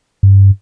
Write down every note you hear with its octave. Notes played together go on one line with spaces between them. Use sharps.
G2